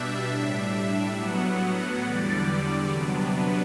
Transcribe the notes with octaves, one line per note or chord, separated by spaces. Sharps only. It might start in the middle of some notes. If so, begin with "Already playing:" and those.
Already playing: B2 G3 D4 E5
A2 G3 D4
A2 F#3 B3 F#5
E2 D3 G3 D5
D5
D5
C3 F#3 B3 D4
B4